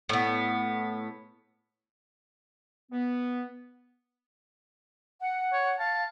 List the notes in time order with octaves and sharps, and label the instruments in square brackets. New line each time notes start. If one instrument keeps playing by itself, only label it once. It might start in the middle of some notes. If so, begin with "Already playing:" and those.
[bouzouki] A2 B3
[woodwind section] B3
[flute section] F#5
[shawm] C#5
[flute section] F5 [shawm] A5